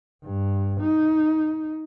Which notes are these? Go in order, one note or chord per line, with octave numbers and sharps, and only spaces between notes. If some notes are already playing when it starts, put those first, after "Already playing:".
G2
D#4